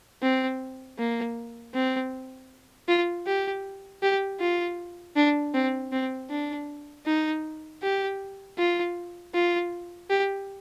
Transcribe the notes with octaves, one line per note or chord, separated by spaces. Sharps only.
C4
A#3
C4
F4
G4
G4
F4
D4
C4
C4
D4
D#4
G4
F4
F4
G4